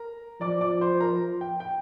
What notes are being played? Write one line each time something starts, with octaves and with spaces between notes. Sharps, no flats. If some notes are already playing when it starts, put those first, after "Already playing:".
Already playing: A#4 A#5
F3 D5 D6
D5 D6
C5 C6
A#4 A#5
G5
G5